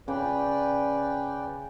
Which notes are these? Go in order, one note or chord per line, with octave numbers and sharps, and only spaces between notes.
C#3 B4 D5 G5